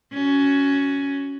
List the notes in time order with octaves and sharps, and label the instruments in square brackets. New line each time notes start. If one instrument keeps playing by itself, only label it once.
[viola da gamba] C#4 F#4